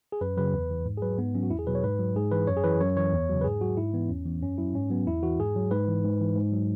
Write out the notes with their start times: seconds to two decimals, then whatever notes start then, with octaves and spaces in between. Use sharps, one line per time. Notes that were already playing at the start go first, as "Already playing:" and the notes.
0.12 G#4
0.21 F#2 B4
0.37 C#3 F#3 B4
0.54 E2
0.70 E3
0.85 G#2
0.98 G#4
1.02 F#3 B4
1.18 G#2 B3
1.35 F#3 C#4
1.43 F#4
1.50 E2 E4
1.59 G#4
1.67 B2 F#3 B4
1.75 C#5
1.83 G#2 B4
1.99 F#3
2.15 G#2 G#4
2.31 E3 B4
2.47 F#2 C#5
2.57 G#4
2.64 E3 B4
2.80 F#2 C#5
2.97 E3 C#5
3.13 E2
3.29 C#3 F#3
3.41 B4
3.44 G#2 G#4
3.61 F#3 F#4
3.77 G#2 E4
3.93 E3 B3
4.09 E2 C#4
4.25 E3 B3
4.42 F#2 C#4
4.58 F#3 E4
4.74 G#2 C#4
4.90 F#3 B3
5.07 E2 E4
5.23 E3 F#4
5.39 G#2 G#4
5.56 F#3
5.71 G#2 B4
5.88 E3
6.04 G#2
6.21 E3
6.36 G#2
6.52 F#3